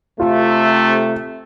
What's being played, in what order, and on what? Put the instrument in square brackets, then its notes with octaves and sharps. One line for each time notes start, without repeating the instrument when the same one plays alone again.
[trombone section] C3 A3 [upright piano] F4